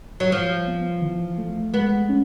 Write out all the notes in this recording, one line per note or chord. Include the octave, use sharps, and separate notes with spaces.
F#3
F3 G3
B3
E3
A3
G#3 B3
C#4